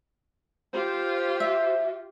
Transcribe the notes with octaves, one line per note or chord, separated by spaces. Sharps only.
F4 G4 C5
E5